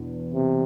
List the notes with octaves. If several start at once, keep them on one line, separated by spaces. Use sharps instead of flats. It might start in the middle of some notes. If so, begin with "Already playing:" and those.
Already playing: E2 B2 D4
C3